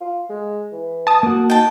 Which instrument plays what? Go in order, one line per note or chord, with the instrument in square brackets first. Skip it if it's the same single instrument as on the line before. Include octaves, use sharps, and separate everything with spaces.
[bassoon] F4
G#3
E3
[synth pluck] A5 D#6
[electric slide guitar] A#3 F#4
[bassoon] D#4 [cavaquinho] G5 A5